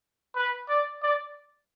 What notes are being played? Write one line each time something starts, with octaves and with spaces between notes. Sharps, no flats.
B4
D5
D5